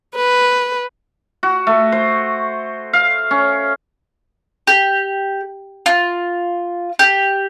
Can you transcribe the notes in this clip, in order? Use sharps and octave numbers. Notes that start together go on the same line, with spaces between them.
B4
F#4
A3
C5
F5
C#4
G4
F4
G4